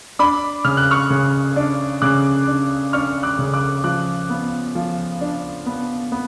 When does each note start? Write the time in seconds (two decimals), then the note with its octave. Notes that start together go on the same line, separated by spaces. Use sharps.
0.19 D4 B5 D6
0.65 C#3 F6
0.77 F#6
0.91 C#6 F6
1.10 C#3
1.56 D4
2.02 C#3 D6 F#6
2.47 D4
2.93 D4 C#6 F6
3.23 D6 F#6
3.39 C#3
3.54 D6 F#6
3.84 F3 D6 F#6
4.30 B3
4.75 F3
5.21 D4
5.66 B3
6.12 B3